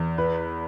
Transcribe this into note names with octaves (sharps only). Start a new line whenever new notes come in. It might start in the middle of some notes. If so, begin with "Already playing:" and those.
Already playing: E2
B4